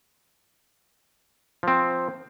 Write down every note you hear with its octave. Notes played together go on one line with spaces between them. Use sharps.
F3 C4